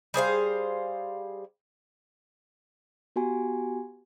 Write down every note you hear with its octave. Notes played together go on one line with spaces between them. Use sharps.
G3 G#4 C5 F5
B3 F#4 G4 G#5